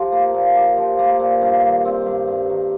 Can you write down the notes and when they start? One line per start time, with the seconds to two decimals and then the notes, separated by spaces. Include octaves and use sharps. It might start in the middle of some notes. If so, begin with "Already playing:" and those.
Already playing: F3 G4
0.12 A#3
0.34 A#2
0.56 G4
0.77 F3
0.99 A#3
1.20 A#2
1.42 G2
1.63 D#3
1.85 C4
2.06 G2
2.28 G2
2.50 D#3